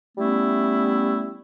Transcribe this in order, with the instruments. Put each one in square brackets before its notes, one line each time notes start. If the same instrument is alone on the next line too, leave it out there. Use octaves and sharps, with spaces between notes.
[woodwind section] G3 A3 B3 C#4 E4